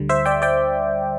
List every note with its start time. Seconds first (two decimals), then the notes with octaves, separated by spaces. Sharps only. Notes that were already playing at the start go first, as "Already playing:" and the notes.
Already playing: D2 D3 G3
0.09 C5 E5
0.26 D5 G5
0.42 D5 G5